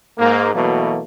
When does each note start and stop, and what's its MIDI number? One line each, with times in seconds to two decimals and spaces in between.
0.19 0.51 44
0.19 0.51 58
0.54 1.01 47
0.54 1.01 52
0.54 1.01 54
0.54 1.01 57
0.54 1.01 58